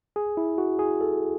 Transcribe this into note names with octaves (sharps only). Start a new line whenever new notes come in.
G#4
E4
F#4
G#4
A4